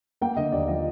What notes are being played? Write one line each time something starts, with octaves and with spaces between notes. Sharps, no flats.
A#3 G5
D3 D#5
D#2 D5
F3 D#5